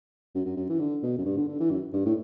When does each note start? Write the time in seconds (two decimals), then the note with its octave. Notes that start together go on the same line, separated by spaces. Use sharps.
0.35 F#2
0.45 F#2
0.57 F#2
0.70 E3
0.80 D3
1.03 B2
1.18 F#2
1.25 G2
1.37 D3
1.48 D3
1.60 E3
1.71 F#2
1.93 G2
2.06 A2